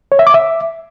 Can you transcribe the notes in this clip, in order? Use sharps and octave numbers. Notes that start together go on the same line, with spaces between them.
C#5
E5
D6
E5